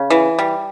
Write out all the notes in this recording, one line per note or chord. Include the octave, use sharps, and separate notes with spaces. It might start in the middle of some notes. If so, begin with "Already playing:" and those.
Already playing: C#3
E3
G3